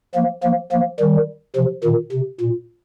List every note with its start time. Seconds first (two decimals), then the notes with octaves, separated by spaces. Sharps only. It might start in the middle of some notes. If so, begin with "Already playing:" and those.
0.15 F3 A#3
0.43 F3 A#3
0.72 F3 A#3
1.00 D#3 G3
1.56 C3 F3
1.84 A#2 D#3
2.12 C3
2.40 A#2